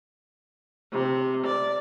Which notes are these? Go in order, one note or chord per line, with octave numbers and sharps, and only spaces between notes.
C3
D5